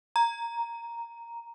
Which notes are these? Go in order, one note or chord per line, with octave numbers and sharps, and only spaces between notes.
A#5